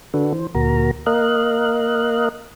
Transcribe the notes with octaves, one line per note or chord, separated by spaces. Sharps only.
D3 D4 F#4 A4 B4
E3 C5
D2 A#2 F#4 A#4 A#5
A#3 A#4 D#5 F5 F#6